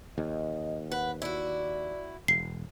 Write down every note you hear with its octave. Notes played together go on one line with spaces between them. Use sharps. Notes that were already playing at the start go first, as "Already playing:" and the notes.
D#2 D#5
B4 F#5
E4 F#4 D5
E1 C7